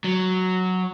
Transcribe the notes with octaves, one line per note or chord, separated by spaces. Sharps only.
F#3